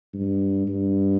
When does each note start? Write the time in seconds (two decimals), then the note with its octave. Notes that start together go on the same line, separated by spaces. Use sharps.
0.14 G2
0.68 G2